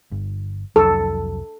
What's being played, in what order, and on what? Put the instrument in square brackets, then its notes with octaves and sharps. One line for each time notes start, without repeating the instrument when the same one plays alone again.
[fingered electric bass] G1
[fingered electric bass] C2 F2 F#3 [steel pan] A4